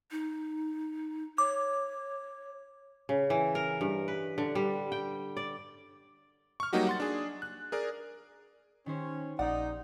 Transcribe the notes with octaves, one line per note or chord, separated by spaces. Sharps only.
D#4
C#5 D6
C#3
E3
A#4
G2
B4
D3
G3
G5
D5
C#6 F6
F#3 G3 A#3 D#4 F#4 G4
F#5 C6 A6
D4 G#4
F#6
G#4 A#4 D5
D#3 C#4 G4 C5
A#1 D#4 D5 F#5